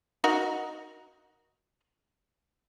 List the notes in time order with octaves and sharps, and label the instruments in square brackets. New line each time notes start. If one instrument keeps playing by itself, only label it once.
[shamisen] D#4 F#4 A#4